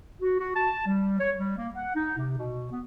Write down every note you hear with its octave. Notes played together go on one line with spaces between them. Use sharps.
F#4
F#4
A5
G3
C#5
G3
A#3
F#5
D#4
C3
B2
B3